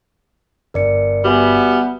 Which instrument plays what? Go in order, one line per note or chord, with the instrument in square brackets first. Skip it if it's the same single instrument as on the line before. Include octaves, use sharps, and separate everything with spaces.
[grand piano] G1 [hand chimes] A#4 D5 C#7
[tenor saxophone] G3 [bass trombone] B3 [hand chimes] F#4 E5 G#5